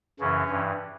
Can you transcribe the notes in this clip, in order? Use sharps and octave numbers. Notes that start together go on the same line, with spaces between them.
F#2 C#3 E3 C#4
G2 E3